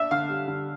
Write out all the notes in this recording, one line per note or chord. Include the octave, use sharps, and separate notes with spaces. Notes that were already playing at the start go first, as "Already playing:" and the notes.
Already playing: D4 E5
D3 F5
G3
D3